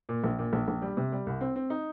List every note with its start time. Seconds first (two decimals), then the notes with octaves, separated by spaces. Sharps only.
0.09 A#2
0.24 A#1
0.39 A#2
0.53 A#1
0.68 A#1
0.82 G3
0.97 C3
1.12 G3
1.26 C2
1.41 C4
1.56 C4
1.70 D#4